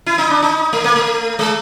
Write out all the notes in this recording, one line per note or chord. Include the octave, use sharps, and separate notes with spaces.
E4
D#4
D4
D#4
A3
A#3
A3
G#3